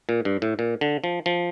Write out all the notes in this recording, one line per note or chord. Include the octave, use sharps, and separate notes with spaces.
A#2
G2
A2
A#2
D3
F3
F3